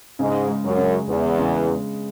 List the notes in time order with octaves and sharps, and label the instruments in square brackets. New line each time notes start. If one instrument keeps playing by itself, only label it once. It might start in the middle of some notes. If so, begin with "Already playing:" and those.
[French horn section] G#2 [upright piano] C#3
[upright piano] G#3
[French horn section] F#2
[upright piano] C#3
[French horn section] E2 [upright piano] B3
[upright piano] C#3
G#3